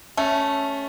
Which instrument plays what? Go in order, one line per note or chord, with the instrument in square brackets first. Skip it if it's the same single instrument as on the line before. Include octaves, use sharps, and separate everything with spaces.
[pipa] A3 [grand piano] C#4